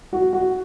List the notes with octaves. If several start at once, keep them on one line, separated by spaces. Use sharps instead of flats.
F#4
F#4